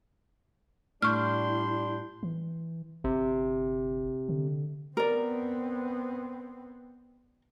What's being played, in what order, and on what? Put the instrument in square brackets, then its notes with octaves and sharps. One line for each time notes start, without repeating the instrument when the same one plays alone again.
[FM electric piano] A2 G6 [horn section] G3 D4 C6 [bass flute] E4 [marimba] C#6 F6
[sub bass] E3
[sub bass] G1 [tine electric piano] C3
[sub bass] D3
[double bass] B3 C4 [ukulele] A#4 D5